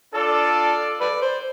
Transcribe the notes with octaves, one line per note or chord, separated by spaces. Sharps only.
D4 F4 A4 D5
B4 D5
C5